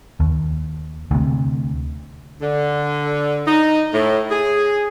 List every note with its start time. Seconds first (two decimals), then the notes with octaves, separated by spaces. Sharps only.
0.20 D#2
1.11 D2 C3
2.42 D3
3.47 D#4
3.93 A2
4.31 G#4